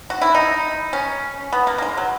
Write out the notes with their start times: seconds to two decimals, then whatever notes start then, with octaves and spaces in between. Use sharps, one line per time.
0.10 F#4
0.21 E4
0.34 D#4
0.93 C#4
1.53 B3
1.67 A#3
1.78 A#3
1.82 G#3
1.97 F#3